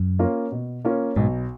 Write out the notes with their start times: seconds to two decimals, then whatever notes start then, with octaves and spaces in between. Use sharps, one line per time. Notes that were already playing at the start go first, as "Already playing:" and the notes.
Already playing: F#2
0.19 A#3 C#4 F4 A#4
0.52 B2
0.85 A#3 C#4 F4 A#4
1.16 B1 G#2